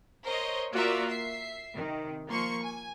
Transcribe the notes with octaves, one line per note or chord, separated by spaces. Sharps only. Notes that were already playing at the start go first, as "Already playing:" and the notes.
A#4 C5 C#5 D#5
A#3 F4 F#4 A#4 D5 E5
E5 C7
C3 D#3
F3 A#3 C6 C#6
G#5